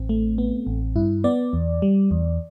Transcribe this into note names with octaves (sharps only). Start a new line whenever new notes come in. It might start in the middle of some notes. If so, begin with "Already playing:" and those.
Already playing: A1 C4
A3
B3
A1
G2 E4
B3 D5
E2
G3
E2